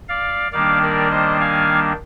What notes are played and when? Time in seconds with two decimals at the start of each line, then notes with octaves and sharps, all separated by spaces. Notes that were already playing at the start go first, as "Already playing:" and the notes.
0.09 D5 F5
0.52 D#3 G3 A#3 D4 D5 F5
0.82 A#4 D5
1.11 C5 D#5
1.40 F5 G#5